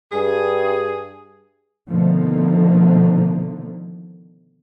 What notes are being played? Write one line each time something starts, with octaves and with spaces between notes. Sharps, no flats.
G2 G#4
B2 D3 D#3 F3 A3 A#3